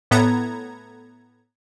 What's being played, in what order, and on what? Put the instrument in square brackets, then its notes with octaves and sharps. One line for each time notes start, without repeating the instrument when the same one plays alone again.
[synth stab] A2 B3 A4 A#5 G#6